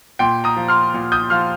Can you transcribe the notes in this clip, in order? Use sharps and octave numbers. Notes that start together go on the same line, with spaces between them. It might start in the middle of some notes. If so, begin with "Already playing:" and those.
A#2 G5 C6
A#5 D#6
F3
C6 F6
A#2
D#6 G6
F3 C6 F6